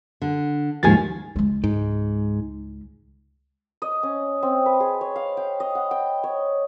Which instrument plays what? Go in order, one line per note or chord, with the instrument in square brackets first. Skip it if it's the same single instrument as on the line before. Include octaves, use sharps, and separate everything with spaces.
[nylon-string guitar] D3
[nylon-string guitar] D#2 F3 G#4 [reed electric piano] G#2 G#5 A6
[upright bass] C#2 G#3
[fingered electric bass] G#2
[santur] D#5
C#4
C4
B4
G#4
C#5
F5
G5
D#5
F#5
G5
C#5